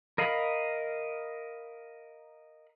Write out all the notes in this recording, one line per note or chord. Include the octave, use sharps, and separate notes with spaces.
A#4 D#5 F5 B5